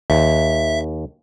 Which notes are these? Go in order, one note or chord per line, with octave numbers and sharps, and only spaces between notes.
D#2 E5